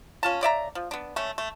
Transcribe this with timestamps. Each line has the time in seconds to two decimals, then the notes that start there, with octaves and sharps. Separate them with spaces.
0.23 C#4 F4 A5
0.41 C#3 D5 E5 A#5
0.75 F3
0.91 B3 D4
1.16 A3 C#4
1.38 A3